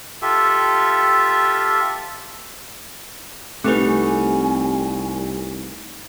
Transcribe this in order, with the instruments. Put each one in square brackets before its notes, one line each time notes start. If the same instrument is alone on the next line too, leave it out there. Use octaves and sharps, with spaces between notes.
[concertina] F4 G4 A4 E5
[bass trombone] C2 [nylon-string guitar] A3 D#4 [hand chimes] C4 G4 B4 [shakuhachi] G#5